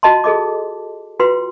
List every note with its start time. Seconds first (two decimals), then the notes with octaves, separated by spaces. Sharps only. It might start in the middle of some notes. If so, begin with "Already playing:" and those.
0.03 F4 F#4 D#5 A5 C6
0.24 G#4 A4 D#5 D6
1.20 F4 F#4 B4 G5 C6